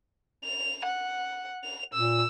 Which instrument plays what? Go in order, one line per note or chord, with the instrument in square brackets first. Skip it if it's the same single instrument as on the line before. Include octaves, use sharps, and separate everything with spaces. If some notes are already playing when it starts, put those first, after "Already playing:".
[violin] F7
F#5
F7
[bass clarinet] A#2 [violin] E6